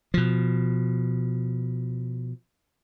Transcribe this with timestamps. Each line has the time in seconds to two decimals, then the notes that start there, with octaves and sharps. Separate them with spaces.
0.14 B2 F3